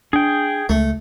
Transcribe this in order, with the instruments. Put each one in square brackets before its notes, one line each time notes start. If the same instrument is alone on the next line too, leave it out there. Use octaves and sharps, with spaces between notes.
[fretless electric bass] D4 [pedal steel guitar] G#4 G5
[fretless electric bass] C#2 [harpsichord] A3